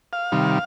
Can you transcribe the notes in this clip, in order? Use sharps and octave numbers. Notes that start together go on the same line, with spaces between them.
F5
C3 D#3 G3